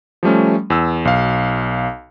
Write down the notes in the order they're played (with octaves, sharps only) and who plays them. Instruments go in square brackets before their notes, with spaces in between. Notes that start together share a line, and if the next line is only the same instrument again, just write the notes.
[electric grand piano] F3 G3 A3 C#4
E2 E6
B1 F5